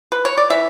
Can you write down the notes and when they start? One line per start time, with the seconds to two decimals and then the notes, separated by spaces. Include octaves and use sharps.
0.12 B4
0.25 C#5
0.37 D5
0.50 E3 E5